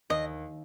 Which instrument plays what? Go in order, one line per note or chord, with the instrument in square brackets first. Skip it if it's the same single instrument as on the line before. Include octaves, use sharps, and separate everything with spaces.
[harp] D#2 [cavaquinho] D#5